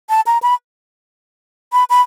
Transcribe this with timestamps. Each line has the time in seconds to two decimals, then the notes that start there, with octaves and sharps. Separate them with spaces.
0.09 A5
0.27 A#5
0.43 B5
1.73 B5
1.90 B5